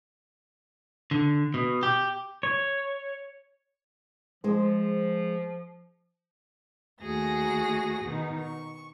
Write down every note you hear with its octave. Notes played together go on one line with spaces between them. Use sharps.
D3
B2
G4
C#5
F3 G#3 C5
D#2 A3 F#4 G#4 A#6
B2 D#3 D#4
C#6